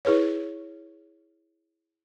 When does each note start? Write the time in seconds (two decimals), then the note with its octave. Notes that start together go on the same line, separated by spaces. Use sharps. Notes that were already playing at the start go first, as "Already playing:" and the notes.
0.05 E4 G#4 B4 C#5